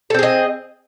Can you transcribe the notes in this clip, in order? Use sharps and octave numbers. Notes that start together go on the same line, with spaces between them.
C4 G#4 A4 D#5